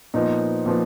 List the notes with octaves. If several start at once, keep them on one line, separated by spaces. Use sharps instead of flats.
A#2 F3 B3 D#4
A#2 F3 B3